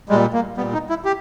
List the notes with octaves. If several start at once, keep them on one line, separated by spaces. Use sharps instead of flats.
A#2 G3 G#3
A#3
A#2 G3 B3
D#4
E4
G4